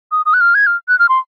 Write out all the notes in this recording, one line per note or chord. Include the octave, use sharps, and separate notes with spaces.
D#6
D#6
F#6
F6
G#6
F6
F#6
F6
C6